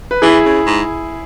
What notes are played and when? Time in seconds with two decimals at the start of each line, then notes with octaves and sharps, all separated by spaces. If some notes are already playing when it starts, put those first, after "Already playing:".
0.11 B4
0.22 E3 E4 G#4
0.45 C#3
0.66 G#2